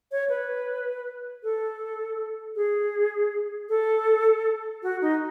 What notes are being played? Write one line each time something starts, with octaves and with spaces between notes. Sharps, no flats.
C#5
B4
A4
G#4
A4
F#4
D#4